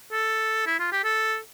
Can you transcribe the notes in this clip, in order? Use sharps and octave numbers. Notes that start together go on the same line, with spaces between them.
A4
E4
F4
G4
A4